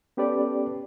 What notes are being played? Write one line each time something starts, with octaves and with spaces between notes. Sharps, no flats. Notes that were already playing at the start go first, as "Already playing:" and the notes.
B3 C#4 G4 A4 B4 D5